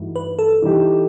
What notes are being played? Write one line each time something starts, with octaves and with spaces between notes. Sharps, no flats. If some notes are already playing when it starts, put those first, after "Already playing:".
Already playing: G2 E3 A3 D#4 F#4
B4
A4
E3 G3 D#4 G4